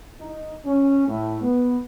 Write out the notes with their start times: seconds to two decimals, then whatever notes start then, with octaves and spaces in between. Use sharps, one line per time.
0.21 D#4
0.66 C#4
1.07 A2
1.42 B3